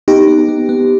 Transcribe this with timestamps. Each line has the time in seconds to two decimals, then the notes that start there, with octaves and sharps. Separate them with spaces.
0.08 B3 D#4 G4
0.28 B3
0.48 B3
0.69 B3